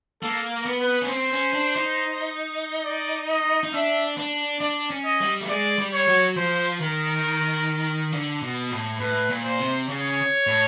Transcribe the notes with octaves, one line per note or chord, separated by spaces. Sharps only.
A#3 A4
A#4
B3
B4
C#4
C4 C5
C#4
D4
D#4
D5
D#5
D#4
D4 E5
D4
D4 D5
C#4
D#5
G3
A3
G#3 D5
G3
C#5
F#3
F3 C5
D#3 A#4
D3
B2
A2
A2 B4
A#2
C5
C3
C#3 C#5
A2